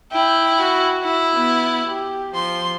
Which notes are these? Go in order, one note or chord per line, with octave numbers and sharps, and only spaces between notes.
E4 G5
F#4
E4
B3
G4
F3 C6